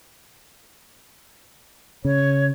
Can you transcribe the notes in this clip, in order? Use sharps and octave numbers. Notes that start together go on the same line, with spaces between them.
C#3 C#5